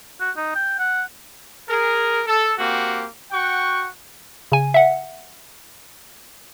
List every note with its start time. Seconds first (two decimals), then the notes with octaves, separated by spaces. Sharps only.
0.20 F#4
0.37 D#4
0.55 G5
0.79 F#5
1.69 G#4 A#4
2.27 A4
2.57 A#3 C4 F#4 G4
3.32 F#4 F#5 G5 C#6
4.52 C#3 G#5
4.74 E5 F#5